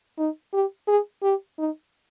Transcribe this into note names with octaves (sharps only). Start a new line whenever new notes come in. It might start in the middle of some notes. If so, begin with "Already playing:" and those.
D#4
G4
G#4
G4
D#4